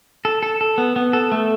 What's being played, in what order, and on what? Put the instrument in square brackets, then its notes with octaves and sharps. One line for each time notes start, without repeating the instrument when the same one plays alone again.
[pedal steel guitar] A4
A4
A4
B3
B3
A4
A3